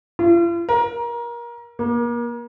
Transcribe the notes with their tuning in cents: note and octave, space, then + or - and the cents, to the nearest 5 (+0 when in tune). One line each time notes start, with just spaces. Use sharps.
F4 -45
A#4 +25
A#3 +35